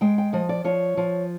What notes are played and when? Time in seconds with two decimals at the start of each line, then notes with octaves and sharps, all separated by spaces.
0.01 G#3 G5
0.18 G5
0.33 F3 D#5
0.49 D5
0.64 F3 C#5
0.97 F3